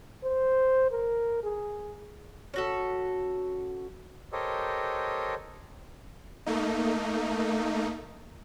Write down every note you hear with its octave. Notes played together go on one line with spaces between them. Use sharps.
C5
A#4
G#4
C#4 F#4 A4
G4 A4 A#4 C5 C#5 D#5
A3 A#3 D#4